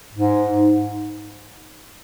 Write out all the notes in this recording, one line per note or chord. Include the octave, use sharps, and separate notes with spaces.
G#2